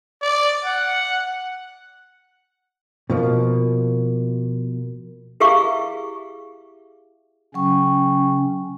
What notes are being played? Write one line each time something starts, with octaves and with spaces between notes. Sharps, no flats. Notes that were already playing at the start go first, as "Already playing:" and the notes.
D5
F#5
B2 F3 A#3
E4 G4 G#4 E5 F5 C#6
C#3 F#3 C#4 G5 C#6